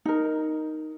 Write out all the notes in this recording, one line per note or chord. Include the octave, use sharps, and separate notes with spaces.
D#4 A#4